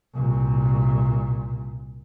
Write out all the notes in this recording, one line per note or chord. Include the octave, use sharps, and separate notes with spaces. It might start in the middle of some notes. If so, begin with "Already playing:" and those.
C2 A#2